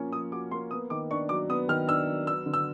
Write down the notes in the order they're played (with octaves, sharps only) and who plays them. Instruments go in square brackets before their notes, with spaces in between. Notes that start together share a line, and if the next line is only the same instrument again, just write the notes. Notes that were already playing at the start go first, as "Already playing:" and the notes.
Already playing: [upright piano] F3 A#3 C#4
[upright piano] F3 [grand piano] D#6
[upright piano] F#4 [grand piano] D6
[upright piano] A#3 [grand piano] C6
[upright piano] B3 [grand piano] D#6
[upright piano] D#3 [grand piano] D6
[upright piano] D4 [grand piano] C#6
[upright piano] F#3 [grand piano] D6
[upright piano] B3 [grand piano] D#6
[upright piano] D#3 [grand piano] F6
[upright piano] D4 [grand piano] E6
[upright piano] F#3
[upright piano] B3 [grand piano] E6
[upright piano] D3
[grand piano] E6